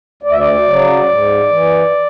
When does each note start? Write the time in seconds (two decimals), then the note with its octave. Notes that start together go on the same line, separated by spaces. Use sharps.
0.23 D2 D5
0.32 E5
0.38 D5
0.66 C#3 F#3
1.06 G#2
1.49 E3